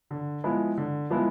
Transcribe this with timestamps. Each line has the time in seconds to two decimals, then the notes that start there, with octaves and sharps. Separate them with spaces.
0.11 D3
0.44 F3 G#3 B3 E4
0.78 D3
1.10 F3 G#3 B3 E4